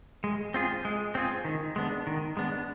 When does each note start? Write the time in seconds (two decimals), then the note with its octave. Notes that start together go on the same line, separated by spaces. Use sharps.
0.24 G#3
0.54 C4 F4 G#4
0.85 G#3
1.15 C4 F4 G#4
1.45 D#3
1.76 G#3 B3 D4
2.07 D#3
2.37 G#3 B3 D4